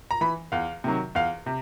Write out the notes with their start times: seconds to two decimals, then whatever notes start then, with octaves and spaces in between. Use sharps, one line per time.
0.11 A#5
0.21 E3 B5
0.52 E2 F5
0.84 C3 D#3 F#3
1.15 E2 F5
1.46 C3